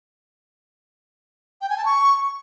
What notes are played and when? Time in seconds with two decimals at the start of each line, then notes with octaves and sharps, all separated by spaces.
1.61 G5
1.69 G#5
1.77 A5
1.85 C#6